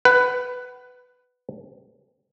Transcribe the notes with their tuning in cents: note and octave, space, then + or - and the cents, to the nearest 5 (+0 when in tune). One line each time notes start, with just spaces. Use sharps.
B4 +10 F#5 +30